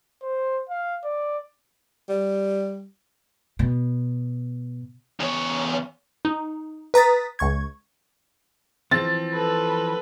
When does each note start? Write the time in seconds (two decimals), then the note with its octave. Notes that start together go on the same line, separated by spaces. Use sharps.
0.22 C5
0.69 F5
1.04 D5
2.09 G3
3.59 B2
5.20 E2 C#5
6.25 D#4
6.94 B4 A#5 D#6 A6 B6
7.39 C#2 C#6 G#6
8.91 E3 F3 C4 A6
9.34 A4 B4